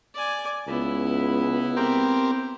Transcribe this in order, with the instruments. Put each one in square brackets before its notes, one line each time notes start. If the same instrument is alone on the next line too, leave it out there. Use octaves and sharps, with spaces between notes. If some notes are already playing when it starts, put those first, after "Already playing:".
[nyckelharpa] D5 G#5
[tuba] C#2 [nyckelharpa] B3 E4
[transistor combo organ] C4 G4 A#4